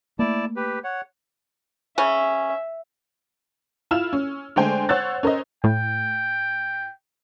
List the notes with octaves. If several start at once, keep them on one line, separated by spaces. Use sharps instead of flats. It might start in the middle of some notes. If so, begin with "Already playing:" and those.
A3 A#3 E4 D5 A5
G4 B4
C#5 F#5
C#3 C#4 E5
E4 F4 E6 F6 E7
C#4
D3 G#3 A3 C5 G5 G#5
C5 C#5 F#5 E6 F#6 A6
C#4 A#4 C5 D#5
A2 G5